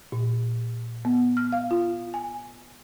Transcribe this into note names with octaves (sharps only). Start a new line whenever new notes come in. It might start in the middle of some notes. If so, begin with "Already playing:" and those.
A#2
B3
F6
F5
F4
G#5